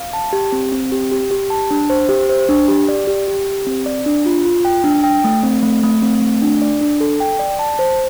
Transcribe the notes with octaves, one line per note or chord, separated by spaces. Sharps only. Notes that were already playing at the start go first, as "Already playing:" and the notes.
Already playing: F5
A5
G4
C4
C4
G4
G4
G4
A5
D4
C5
G4
C5
D4
G4
D5
G4
G4
G4
C4
D5
D4
F4
F4
G5
D4
G5
A3
C4
A3
A3
C4
A3
D4
D5
D4
A4
G5
D5
A5
C5